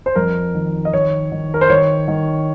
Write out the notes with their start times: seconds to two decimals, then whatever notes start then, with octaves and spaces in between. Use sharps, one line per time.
0.06 C5
0.16 F2 A#4
0.54 D#3
0.85 D#5
0.93 D#3 C#5
1.32 D#3
1.54 A#4
1.61 C5
1.70 D#3 C#5
2.08 D#3